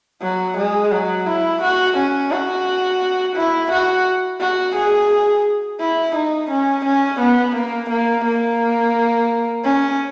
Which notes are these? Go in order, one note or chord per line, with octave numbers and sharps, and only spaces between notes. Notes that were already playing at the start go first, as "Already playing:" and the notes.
F#3
G#3
F#3
E4
F#4
C#4
F#4
E4
F#4
F#4
G#4
E4
D#4
C#4
C#4
B3
A#3
A#3
A#3
C#4